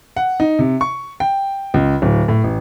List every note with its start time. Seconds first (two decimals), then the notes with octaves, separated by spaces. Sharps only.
0.17 F#5
0.40 D#4
0.59 C3
0.81 C#6
1.20 G5
1.74 C#2
2.02 D1
2.28 A2
2.44 A1